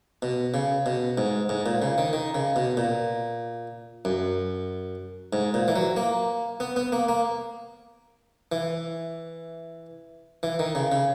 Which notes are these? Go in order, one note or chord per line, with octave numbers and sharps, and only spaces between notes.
B2
C#3
B2
G#2
G#2
A#2
C#3
D#3
D#3
C#3
B2
A#2
F#2
G#2
A#2
E3
F#3
A#3
B3
B3
A#3
A#3
E3
E3
D#3
C#3
C#3